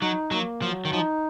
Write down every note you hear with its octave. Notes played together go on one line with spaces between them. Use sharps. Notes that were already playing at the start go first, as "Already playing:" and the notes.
F#3 D#4
F#3 A#3
F3 F#3
D#3
F3 D#4